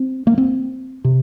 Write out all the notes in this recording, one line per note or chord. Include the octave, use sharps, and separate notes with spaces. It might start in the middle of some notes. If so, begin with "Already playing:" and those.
Already playing: C4
A#3
C4
C3